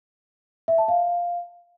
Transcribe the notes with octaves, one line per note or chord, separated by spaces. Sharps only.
E5
A5
F5